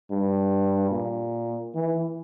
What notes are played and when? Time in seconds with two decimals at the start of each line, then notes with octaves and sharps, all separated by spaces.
0.11 G2
0.91 A#2
1.75 E3